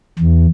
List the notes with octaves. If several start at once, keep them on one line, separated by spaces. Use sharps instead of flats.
E2